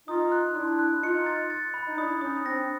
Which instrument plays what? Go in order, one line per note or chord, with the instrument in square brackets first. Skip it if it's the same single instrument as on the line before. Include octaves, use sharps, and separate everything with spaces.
[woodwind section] D#4 F4 [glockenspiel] D#6
[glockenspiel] F#6
[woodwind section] D4 E4 [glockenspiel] C6
[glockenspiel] F#6
[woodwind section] D#4 F4 [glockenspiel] C#7
[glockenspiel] A6
A6
B5
[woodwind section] D#4
[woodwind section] D4 E4 [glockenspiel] D#6
[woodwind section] C#4 D#4 [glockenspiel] D#6
[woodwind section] C4 D4 [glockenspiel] A#6